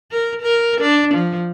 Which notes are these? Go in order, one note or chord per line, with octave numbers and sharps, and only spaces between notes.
A#4
A#4
D4
F3